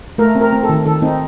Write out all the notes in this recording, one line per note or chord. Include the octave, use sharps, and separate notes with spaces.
A3 A#4
C4
A#4
C4
A4
D#3
D#3 A4
C4 D#4